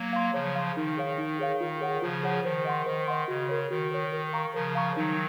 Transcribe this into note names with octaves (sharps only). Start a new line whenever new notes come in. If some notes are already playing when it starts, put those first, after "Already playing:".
Already playing: F#3 A#3
F5 C6
C#3 F3 C#5
F5 C6
D#3 D#4
G#4 C#5 F5
D#4
G#4 C#5 F5
D#3 F4
G#4 C#5 F#5
C#3 F3 F4
G#4 C#5 F#5
D#3 C5
D#5 F#5 C6
D#3 C5
D#5 F#5 C6
C#3 F#4
A#4 C#5
D#3 F#4
A#4 C#5
A#4
F5 A#5 C#6
C#3 F3 A#4
F5 A#5 C#6
D#3 F#3 D#4